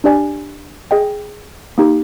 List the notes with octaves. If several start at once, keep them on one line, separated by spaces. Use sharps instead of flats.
D4 G4 D5 G#5
G#4 D#5 G5
A#3 D#4 G4